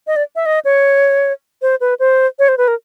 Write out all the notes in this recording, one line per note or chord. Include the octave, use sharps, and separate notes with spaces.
D#5
D5
E5
D#5
C#5
C5
B4
C5
C#5
C5
B4
A#4